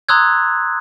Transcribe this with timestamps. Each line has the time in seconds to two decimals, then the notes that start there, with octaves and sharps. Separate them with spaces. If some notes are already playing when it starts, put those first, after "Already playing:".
0.09 A#5 C6 D#6 E6 F#6 G#6